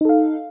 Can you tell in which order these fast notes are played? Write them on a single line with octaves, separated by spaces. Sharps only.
D#4 A4 F5